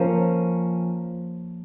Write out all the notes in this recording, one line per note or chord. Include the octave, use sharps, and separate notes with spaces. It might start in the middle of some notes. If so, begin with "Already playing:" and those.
Already playing: F3 A#3 C#4